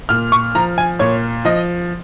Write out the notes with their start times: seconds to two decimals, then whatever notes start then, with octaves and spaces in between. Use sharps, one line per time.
0.09 A#2 F6
0.32 C#6
0.55 F3 A#5
0.78 G#5
0.99 A#2 C#5
1.45 F3 D#5